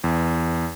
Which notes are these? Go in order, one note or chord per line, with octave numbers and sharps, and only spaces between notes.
E2